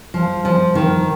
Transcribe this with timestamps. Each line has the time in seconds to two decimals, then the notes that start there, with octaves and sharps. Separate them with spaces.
0.14 F3
0.45 F3
0.75 D#3